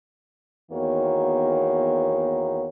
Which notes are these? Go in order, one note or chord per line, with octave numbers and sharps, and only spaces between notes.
E2 D#3 A#3 B3 F#4 C#5